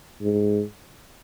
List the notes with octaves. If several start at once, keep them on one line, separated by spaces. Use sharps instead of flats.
G#2